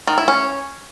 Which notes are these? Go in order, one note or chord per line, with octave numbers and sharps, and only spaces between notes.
D#3
E4
C#4